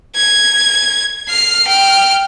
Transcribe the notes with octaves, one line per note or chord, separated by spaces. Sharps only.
G#6
F6 C7
G5 F6